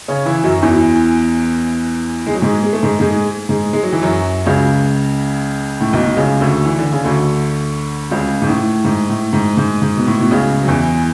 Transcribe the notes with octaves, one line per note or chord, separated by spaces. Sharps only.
C#3 C#4
E3 E4
F#2 F#3
E2 E3
G#3
F#3
G#2 G#3
G#3
A3
G#2 G#3
G#2 G#3
G#2 G#3
G#3
F#3
E3
F#2 F#3
C#2 C#3
A2
B1 B2
B2
C#2 C#3
D2 D3
E3
D3
C#3
D2 D3
C#2 C#3
G#2
A2
G#2
A2
G#2
G#2
G#2
B2
A2
B2
C#2 C#3
F#3
E2 E3